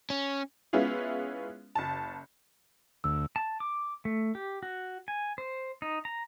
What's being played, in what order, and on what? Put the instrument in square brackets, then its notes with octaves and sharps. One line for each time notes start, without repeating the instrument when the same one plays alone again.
[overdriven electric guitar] C#4
[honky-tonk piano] G#3 B3 C#4 E4 F4 G#4
F#1 A5
[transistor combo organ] D2 [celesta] E6
[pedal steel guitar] A5
D6
A3
G4
F#4
G#5
C5
D#4
A#5